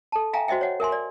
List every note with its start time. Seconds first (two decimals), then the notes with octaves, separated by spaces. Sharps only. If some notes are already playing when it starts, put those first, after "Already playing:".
0.12 A4 A5
0.33 E5 F5 G5 G#5 A#5
0.48 F#4 C5 D#5 E5 G5
0.61 C#5 F#5
0.80 A#4 E5 G#5 C6
0.92 D5